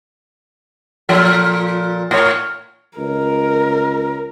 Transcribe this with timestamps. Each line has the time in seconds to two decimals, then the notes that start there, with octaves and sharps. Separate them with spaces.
1.09 A#2 F3 A4
2.11 A2 C#5
2.98 C#2 A#4